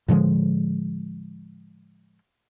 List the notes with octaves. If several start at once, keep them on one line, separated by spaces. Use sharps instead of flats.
A2 D3 F3 G#3